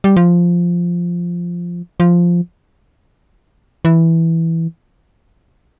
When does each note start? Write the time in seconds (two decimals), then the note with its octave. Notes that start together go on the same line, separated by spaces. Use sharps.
0.04 G3
0.16 F3
2.00 F3
3.85 E3